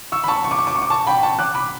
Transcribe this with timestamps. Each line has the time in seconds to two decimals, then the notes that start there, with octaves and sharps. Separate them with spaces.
0.12 C#6 E6
0.24 B5
0.28 A5 C#6
0.44 C#6
0.51 D6
0.59 C#6
0.67 D6
0.75 C#6
0.82 D6
0.90 A5 C#6
1.07 G5 B5
1.23 A5 C#6
1.39 D6 F#6
1.55 B5 D6